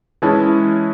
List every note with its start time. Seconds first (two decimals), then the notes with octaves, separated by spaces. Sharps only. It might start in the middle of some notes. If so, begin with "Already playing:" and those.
0.22 E3 G#3 C#4 E4 A5